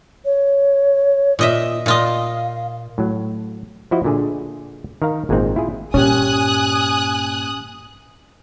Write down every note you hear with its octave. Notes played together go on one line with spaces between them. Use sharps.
C#5
A#2 F4 D#5 E5
A#2 F4 D#5 F5
A2 F#3
F3 E4 F#4 D#5
A#2 D3 G#4
D#3 A#4 F5 A#5
G#1 A#2 G#3 A#3 C4 D#4
E4 F4 G#4
G2 A#2 C#4 G4 G#5 D#6 F#6